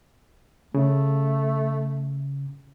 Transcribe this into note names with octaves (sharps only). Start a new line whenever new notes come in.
C#3 A3